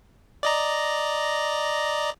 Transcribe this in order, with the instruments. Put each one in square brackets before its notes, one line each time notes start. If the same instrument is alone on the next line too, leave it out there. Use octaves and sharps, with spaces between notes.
[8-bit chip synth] D5 D#5 A#5